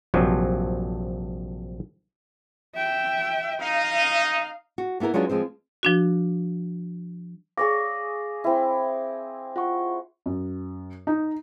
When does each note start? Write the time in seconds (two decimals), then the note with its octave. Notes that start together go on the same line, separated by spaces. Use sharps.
0.14 A#1 G2 C3 F3 F#3
2.75 E5 G5
3.61 D#4 F5
4.78 F#4
5.00 A#3 B3 E4 A4 A#4
5.14 F#3 G#3 C#4 D4 F4
5.29 F3 G#3 C4 C5
5.83 F3 D4 F#4
7.57 G#4 C#5 D5 F5 D6 A#6
8.44 C4 E4
9.56 F4 F#5 C#6
10.26 F#2
11.07 D#4